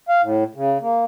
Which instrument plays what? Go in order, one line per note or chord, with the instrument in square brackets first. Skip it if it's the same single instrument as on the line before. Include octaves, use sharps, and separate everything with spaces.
[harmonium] F5
A2
C#3
A#3